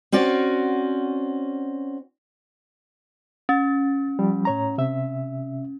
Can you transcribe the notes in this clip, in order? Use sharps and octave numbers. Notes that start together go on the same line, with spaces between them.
C4 C#4 F#4 D5
C#4 A6
F3 G3
A2 C#5 A#5
C3 E5